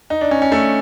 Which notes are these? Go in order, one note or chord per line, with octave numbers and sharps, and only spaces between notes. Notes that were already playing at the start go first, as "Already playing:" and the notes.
D#4
D4
C#4
C#4
A3